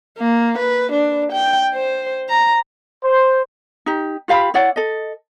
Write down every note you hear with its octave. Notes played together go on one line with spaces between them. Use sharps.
A#3
B4
D4
G5
C5
A#5
C5
D#4 G4
F4 G4 F5 B5
E4 C#5 D5 F#5
A4 D#5